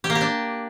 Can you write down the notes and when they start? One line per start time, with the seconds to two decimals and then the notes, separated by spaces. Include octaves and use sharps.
0.04 G4
0.10 A#3
0.15 G4
0.21 D4